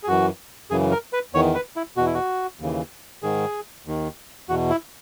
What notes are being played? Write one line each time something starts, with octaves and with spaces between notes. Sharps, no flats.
G#4
F#2 E3 F#4
F#2 C#3 E3 G#4
A#4
B4
E2 D#3 C#5
B4
E4
E2 B2 F#4
E4
F#4
D#2 C#3 E3
G#2 D#3 G#4
D#2 D#3
E2 B2 F#4
E4